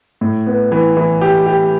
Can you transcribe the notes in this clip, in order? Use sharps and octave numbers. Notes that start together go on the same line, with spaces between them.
A2
B3
E3
E3
G4
G4